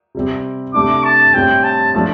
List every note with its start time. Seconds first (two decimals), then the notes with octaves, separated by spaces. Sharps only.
0.15 C3 G3 C4
0.74 C3 A3 D4 D6
1.04 A5
1.34 A2 G3 C4 G5
1.64 A5
1.94 F3 A3 D4